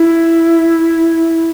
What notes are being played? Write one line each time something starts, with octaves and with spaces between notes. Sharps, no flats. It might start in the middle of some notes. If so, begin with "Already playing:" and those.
Already playing: E4